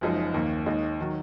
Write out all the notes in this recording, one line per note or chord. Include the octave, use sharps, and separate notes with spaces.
F#1 F#2 F3 G#3 D#4
D#2 D#3 A#3
D#2 D#3 G#3 D#4
D#3 F#3